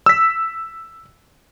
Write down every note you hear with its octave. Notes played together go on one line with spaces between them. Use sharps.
E6 B6